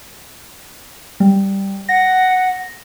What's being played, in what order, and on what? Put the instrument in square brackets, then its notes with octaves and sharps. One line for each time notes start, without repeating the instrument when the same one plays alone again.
[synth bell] G3
[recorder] F#5 [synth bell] A#6